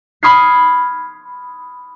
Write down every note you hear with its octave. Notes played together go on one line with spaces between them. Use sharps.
B5 C#6 D#6 F6 G#6 C7